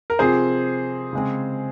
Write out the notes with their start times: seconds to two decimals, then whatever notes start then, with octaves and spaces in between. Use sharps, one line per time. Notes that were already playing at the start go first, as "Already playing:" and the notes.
0.10 A#4
0.19 C3 F3 C4 F4 G#4 C5
1.13 C#3 G#3 C4